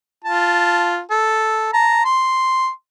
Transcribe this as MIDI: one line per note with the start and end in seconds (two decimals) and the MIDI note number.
0.24 1.00 65
0.24 1.00 81
1.10 1.70 69
1.73 2.03 81
1.73 2.03 82
2.05 2.69 84